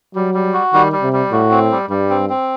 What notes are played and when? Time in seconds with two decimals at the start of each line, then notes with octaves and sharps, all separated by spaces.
0.15 F#3 G3
0.34 G3
0.54 F#4
0.73 D#3 G3
0.92 G3
1.02 C3
1.13 G3
1.32 A2 F#4
1.51 C4
1.71 G3
1.90 G2 G3
2.10 C4
2.29 C4